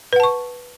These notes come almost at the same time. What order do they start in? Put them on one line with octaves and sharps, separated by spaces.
B4 F#5 A5 C#6